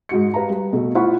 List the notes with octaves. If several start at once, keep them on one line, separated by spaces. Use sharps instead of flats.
G#2 F#4 C#7
G4 B4 F5 A#5
G3
B2 A3
E4 F4 C5 F#5 B5 C#6